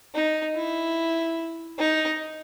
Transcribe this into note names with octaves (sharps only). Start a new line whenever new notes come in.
D#4
E4
D#4